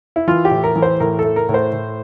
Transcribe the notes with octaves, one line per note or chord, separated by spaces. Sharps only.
E4
E3 F4
G4
A2
A#4
E3
C5
A2 A#4
A4
A3
A#4
A2
C5
A2